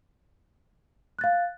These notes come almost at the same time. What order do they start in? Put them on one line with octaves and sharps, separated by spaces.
F#6 A6 F5